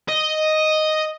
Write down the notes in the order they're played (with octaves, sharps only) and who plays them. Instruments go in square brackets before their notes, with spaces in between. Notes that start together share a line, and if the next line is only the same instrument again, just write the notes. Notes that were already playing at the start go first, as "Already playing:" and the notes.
[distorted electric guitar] D#5